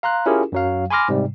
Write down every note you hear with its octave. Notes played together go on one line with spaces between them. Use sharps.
F5 A#5 C6 F#6
C#4 E4 F4 G4 G#4 A#4
F#2 F#3 F5
G#5 B5 C6 D6 F6 A#6
G#2 C3 G3